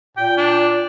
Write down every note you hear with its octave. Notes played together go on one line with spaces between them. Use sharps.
A#2 G5
D4